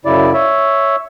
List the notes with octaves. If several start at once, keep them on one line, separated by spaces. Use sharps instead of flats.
F#2 C#3 E4 D5
C#5 E5